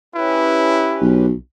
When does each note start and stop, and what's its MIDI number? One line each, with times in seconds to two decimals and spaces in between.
0.15 1.26 61
0.15 1.06 64
0.15 1.26 67
0.15 1.26 71
1.02 1.32 35